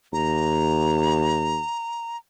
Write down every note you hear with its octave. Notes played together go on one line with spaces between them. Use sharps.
D#2 A#5